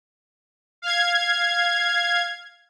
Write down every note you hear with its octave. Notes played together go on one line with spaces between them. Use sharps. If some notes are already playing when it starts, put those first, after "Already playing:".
F5 G#6